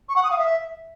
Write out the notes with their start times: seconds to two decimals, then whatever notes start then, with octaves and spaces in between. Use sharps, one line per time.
0.09 C#6
0.16 F#5
0.23 D#6
0.31 F5
0.38 E5